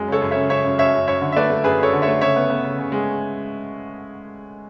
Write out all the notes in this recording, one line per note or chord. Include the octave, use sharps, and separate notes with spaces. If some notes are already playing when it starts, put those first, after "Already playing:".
Already playing: F#2 G#3
C#3 A4 C#5
F#2
C#5 E5
C#3
C#3 C#5 E5
F#2
F#2 C#5 E5
F#2
F#2 C#5 E5
D3
E5
A3 B4 D5
A3
F#2 G#4 B4
F#2 A4 C#5
D3
C#5 E5
A3
C#3 C#5 E5
B3
B3
C#3
C#3
G#3